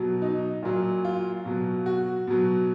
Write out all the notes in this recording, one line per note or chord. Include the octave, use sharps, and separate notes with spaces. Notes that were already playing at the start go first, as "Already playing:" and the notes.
Already playing: B2 F#3
D#4
A#2 F#3
F4
B2 F#3
F#4
B2 F#3